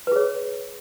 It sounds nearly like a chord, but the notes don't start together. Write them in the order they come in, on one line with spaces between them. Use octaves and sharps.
B4 G#4 C#5